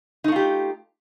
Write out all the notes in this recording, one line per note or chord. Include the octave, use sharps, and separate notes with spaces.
A3 D#4 F4 G4